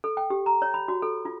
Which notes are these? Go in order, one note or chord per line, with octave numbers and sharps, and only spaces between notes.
A4
G5
G4
A#5
C#5
B5
F#4
A4
F4